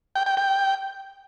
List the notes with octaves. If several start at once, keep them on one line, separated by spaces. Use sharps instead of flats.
G5
G5
G5